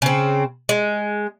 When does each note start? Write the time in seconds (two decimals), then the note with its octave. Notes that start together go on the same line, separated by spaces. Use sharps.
0.02 C#3 C4
0.69 G#3